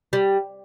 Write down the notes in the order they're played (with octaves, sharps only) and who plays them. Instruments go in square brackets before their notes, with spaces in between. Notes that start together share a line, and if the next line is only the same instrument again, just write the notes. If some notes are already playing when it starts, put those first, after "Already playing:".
[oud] G3